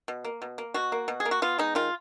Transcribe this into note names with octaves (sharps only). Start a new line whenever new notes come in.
B2
A#3
B2
A#3
B2 F#4
A#3
B2
G#4
A#3
F#4
B3 F4
G#3 D#4
D#3 F4